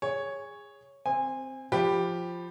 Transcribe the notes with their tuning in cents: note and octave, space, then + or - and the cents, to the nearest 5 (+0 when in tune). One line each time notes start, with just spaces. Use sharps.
G#4 -15 C#5 +0
C4 +0 G#5 -25
F3 +0 G4 +0 B5 +0